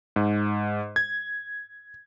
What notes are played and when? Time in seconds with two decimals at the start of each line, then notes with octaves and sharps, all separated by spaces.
0.16 G#2
0.96 G#6